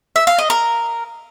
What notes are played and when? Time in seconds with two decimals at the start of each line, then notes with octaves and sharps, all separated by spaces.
0.16 E5
0.27 F5
0.38 D#5
0.50 A#4